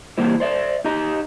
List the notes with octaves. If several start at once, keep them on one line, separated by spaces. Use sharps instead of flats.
E3 G3 A#3 E4 C5
C5 D5 E5
D#4 G4 D#5 A#5